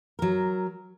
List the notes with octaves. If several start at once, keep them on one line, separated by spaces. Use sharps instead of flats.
F#3 A#4